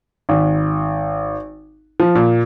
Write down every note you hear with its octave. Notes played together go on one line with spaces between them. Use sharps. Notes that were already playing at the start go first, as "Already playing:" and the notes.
G#1
F3
A#2